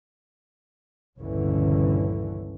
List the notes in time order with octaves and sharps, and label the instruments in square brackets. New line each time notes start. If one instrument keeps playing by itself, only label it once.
[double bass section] G1 C#2 A#2 D3 E3 C#4